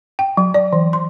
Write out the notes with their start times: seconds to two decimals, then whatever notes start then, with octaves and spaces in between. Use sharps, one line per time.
0.19 G5
0.37 F#3
0.54 D5
0.73 E3
0.93 C6